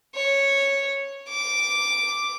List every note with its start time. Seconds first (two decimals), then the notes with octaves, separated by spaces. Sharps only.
0.15 C#5
1.29 D6